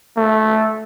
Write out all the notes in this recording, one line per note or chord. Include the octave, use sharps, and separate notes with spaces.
A3